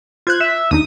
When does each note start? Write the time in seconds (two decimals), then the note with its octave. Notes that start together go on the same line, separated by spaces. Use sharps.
0.27 F4 C5 F#6 G#6
0.40 E5
0.71 D#2 D3 D#4 D#6